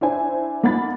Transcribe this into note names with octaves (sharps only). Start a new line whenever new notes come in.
D4 E4 C5 G#5
A#3 D#4 F#5 B5 A6